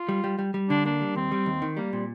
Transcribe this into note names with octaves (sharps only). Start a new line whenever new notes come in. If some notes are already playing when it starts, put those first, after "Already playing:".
Already playing: F4
G3
G3
G3
G3
D3 D4
A#3 D4
G3
D#2 C4
G3
D#2
D#3
G3 A#3
A#2 C4